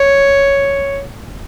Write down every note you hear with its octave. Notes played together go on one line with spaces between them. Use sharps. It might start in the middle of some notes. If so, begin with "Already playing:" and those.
Already playing: C#5